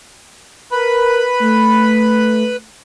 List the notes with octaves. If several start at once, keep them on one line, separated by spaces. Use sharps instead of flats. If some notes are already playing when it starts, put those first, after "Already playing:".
A#4 B4 B5
A3